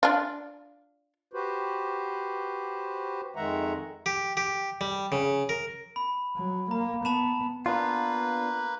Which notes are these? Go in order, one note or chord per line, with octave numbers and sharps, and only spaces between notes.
D4 F4
F#4 G4 B4 C5
F2 D#3 G#3 E5 F#5 A#5
G4
G4
G3
C#3
A#4
B5
F#3
A#3 A#5
B3 A5 B5 E7
A#3 B3 D4 F4 B4